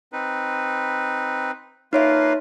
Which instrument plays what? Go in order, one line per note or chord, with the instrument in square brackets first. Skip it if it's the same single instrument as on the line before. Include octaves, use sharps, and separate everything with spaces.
[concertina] C4 D#4 B4
[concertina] A#3 F4 B4 [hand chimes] D#4 C#5 E5